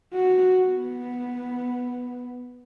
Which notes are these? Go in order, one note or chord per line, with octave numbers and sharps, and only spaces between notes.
F#4
B3